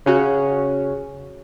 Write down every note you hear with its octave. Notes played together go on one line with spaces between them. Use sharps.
C#3 C#4 F#4